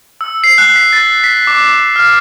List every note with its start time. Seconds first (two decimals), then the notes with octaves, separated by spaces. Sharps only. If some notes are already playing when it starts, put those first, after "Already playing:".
0.21 E6
0.44 C7
0.58 F#6
0.76 B6
0.93 A6
1.24 B6
1.47 D6
1.96 F6